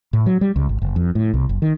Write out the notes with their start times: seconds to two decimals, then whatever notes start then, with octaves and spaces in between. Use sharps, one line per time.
0.13 A2
0.26 F#3
0.41 G3
0.56 C#2
0.69 G#1
0.82 F#1
0.96 F2
1.15 A2
1.34 C2
1.49 F#1
1.62 D#3